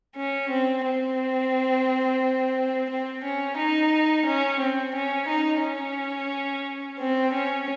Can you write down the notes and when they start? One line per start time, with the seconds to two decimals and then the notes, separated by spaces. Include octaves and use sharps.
0.16 C#4
0.50 C4
0.86 C4
2.90 C4
3.24 C#4
3.57 D#4
4.26 C#4
4.60 C4
4.94 C#4
5.28 D#4
5.62 C#4
6.99 C4
7.33 C#4